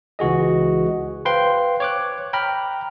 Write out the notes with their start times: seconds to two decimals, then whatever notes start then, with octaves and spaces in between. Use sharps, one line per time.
0.19 C#2 E3 F#4 G#4 D#5
1.25 B4 C5 F5 G5 C6
1.80 C#5 D6 F#6
2.33 G5 A#5 B5 F6